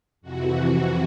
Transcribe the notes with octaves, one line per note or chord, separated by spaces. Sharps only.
F2 C3 E3 F#4